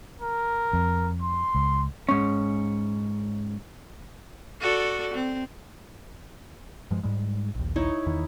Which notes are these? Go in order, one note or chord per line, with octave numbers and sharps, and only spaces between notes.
A#4
F2
C6
C#2
G#2 C#4
F#4 A4 D5
C4
G2 F3 G#3
G#2 G3 G#3
A#1 D#2
D#4 E4 C#5
E2 D#3